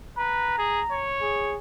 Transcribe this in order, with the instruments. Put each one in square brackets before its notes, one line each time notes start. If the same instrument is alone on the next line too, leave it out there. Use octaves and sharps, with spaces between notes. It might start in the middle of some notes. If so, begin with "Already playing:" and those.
[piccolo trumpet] B4 [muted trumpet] A#5
[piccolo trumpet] G#4
C#5
[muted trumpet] G#4